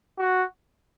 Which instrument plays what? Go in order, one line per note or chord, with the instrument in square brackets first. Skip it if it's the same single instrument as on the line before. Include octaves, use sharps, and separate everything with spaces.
[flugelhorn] F#4